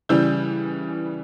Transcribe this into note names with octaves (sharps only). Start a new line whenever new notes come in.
C#3 E3 G3 E6 G6